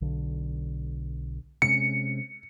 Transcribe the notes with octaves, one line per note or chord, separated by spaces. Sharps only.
B1 D3
C3 G#3 C#4 C#7